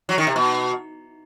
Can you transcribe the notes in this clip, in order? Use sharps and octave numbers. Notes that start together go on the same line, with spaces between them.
F#3
D#3
C3
B2